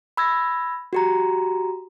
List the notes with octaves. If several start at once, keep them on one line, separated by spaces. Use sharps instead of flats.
B5 E6 G#6 A#6
F#4 G4 A#5